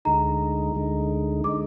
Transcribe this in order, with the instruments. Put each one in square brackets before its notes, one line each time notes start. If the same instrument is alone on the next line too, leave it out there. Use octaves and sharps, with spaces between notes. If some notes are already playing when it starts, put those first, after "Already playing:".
[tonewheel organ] D2 D3 G#3 D#4 [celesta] A#5
[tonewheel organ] D2 D3 G#3 D#4
[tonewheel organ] D3 G#3 D#4 [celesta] D6